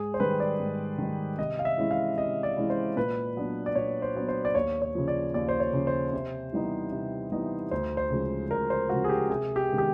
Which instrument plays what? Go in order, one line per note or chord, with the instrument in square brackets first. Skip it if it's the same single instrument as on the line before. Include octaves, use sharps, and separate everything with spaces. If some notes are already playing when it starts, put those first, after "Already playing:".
Already playing: [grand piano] G#2 G#4
C5
D#3 G3 B4
D5
G#2
D#3 G3
C3 D#5
F5
E5
E3 G#3 C#4 E4
F5
C3 D#5
D5
E3 G#3 C#4 E4
C5
A#2 B4
F#3 B3 D4
D5
A#2 C#5
C5
F#3 B3 D4
C5
D5
D#2 C#5
C#5
C#3 F3
D5
D#2 D5
C5
C#5
C#3 F3
C5
C3
E3 G3 B3 D#4
C3
E3 G3 B3 D#4
D2 C5
C5
C#3 F3 G#3
D2 A#4
C5
C#3 F3 G#3 F#4
G#4
G4
C3 G#4
G4
D#3 G#3 B3
G4